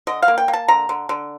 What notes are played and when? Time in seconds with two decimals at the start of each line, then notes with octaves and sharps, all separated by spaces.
0.07 D3 D#5
0.22 F5
0.28 A#3
0.38 G5
0.48 A#3
0.53 A5
0.68 D3 A#5
0.89 D3
1.09 D3